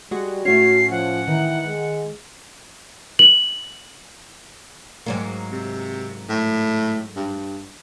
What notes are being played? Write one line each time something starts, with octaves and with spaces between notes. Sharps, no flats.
G3 G#3 F#4
A2 C#4 F#4 C7
F3 F#5
D#3 E3
G#3
F#7
G#2 F#3 A#3
C3
A2
G2